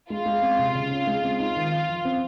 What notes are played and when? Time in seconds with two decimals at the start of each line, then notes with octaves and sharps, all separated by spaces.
0.10 G#3 F4
0.26 G#3
0.42 C4
0.59 C3
0.75 C#3
0.91 C#4
1.07 G#3
1.23 C4
1.39 D#4 F4
1.56 D#3
1.72 F3
1.89 F3
2.05 C4